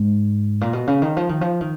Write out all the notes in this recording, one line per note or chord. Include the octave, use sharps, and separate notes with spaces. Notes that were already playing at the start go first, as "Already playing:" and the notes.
Already playing: G#2
A#2
B2
C#3
D#3
F3
D#3
F3
D#3